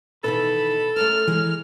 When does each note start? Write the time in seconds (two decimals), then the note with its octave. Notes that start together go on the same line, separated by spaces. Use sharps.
0.24 B2 D#3 E3 A4 B4 B5
0.96 A3 C#4 A#4 F6
1.28 E3 G#3 A#3